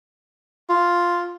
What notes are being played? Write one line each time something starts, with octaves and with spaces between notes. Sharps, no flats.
F4